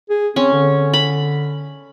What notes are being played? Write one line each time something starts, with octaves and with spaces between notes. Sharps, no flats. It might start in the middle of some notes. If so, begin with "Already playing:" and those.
G#4
C4 C#4
D3
B5